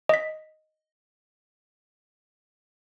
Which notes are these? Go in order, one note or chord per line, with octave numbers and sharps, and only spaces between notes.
D#5 B6